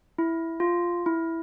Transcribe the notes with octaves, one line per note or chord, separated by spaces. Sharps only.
E4
F4
E4